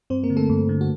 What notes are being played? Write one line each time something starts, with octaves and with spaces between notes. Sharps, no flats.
G2 C4 C5
A#3 A#4
D3
A3 A4
G2
D3
F#4